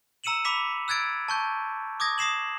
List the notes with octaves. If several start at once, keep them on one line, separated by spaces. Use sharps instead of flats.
A#5 E6 C#7 D#7 E7 F#7
B5 D6 B6 F7
E6 F#6 G#6 A6 D7
A5 C#6 G6
D6 D#6 G#6 A#6
D#6 A#6 C7 E7 F#7